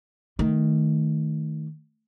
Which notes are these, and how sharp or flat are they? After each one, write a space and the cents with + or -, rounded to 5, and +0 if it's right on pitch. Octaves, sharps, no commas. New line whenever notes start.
D#3 +0 A3 +0